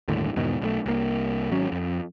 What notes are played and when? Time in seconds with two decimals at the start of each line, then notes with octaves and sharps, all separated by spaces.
0.08 G1 D#2 A2 D3
0.36 E2 G#2 B2 D#3
0.62 B1 F#3 A3
0.86 C2 A#3
1.51 G#1 F#3 C#4
1.72 F2